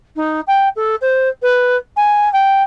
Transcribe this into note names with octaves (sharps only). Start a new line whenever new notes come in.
D#4
G5
A4
C5
B4
G#5
G5